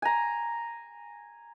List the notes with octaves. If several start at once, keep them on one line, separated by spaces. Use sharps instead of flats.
G#5 A#5